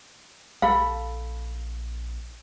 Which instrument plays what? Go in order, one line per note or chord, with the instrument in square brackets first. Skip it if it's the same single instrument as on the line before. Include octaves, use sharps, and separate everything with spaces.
[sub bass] A#1 [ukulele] A4 B5 [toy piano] F5